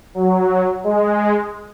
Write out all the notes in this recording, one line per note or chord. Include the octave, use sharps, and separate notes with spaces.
F#3
G#3